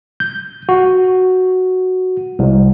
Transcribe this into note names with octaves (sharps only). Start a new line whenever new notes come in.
G6
F#4
C2